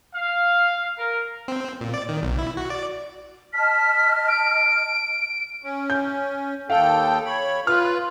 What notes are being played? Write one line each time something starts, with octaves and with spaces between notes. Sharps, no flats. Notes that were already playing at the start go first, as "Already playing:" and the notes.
F5
A#4
C4
A#2
D5
D#3
B1
E4
F#4
D5
D#5 A5 F6 B6
D7
C#4
G6
D#2 A4 F5 G5
C#5 B5
F4 B4 F6